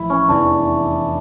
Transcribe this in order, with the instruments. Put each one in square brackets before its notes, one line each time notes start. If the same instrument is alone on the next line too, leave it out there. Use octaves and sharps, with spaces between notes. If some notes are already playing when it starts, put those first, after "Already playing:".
Already playing: [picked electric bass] A1 F3 [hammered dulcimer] E4
[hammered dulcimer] C#4
[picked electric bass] F1 E2 E3 [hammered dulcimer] D4